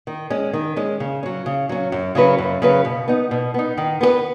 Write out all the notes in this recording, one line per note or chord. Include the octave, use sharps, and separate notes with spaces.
D#3
G#3 C#4
D#3
G#3 C#4
C#3
F#3 C#4
C#3
F#3 C#4
F#2
C#3 F#3 C#4 B4
F#2
C#3 F#3 C#4 B4
B2
B3 D#4
B2
B3 D#4
D#3
B3 G#4 B4